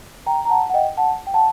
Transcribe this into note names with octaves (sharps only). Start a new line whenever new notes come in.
G5 A#5
A#5
F#5 A5
F#5
D#5 G5
F#5 A5
G5
F#5 A5